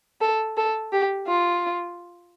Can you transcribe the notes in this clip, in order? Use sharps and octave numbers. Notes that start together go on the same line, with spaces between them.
A4
A4
G4
F4